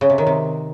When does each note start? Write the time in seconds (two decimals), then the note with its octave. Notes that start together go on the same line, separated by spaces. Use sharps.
0.01 C#3
0.10 C3
0.18 D#3
0.27 C3